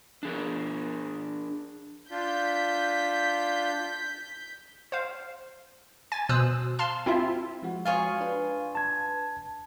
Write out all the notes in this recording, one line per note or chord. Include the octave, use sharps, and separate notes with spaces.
D4 G#4 A#4
D4 F4 G6 B6
C5 F5
G#5 A6
B2 C5 D#6 E6 F#6
F5 A5 C6 F6
C4 E4 F4 E5
F3 G#3 F#4
F4 G#4 C#5 F5
D4 B4
A5 G#6